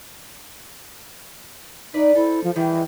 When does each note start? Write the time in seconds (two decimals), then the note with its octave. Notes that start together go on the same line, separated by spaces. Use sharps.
1.94 D#4 B4 D5 E5
2.15 E4 A4 C5
2.44 F3
2.55 D#3 E3 G3 G#3